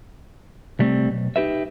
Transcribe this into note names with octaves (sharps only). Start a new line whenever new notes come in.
C3 G3 A3 C4
B1
D#4 G4 B4 E5